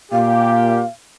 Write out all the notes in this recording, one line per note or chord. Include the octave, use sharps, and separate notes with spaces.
A#2 G4 F5